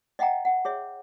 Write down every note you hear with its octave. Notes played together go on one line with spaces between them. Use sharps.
D#5 E5 F#5 G5 A#5
F#5
G#4 C#5 E5